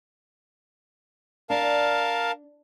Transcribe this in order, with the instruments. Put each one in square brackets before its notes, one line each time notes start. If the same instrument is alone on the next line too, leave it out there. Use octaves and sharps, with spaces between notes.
[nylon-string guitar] D4 [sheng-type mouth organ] A#4 F5 A5